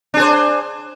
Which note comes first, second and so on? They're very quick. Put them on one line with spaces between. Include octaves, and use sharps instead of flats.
D4 G#4 C5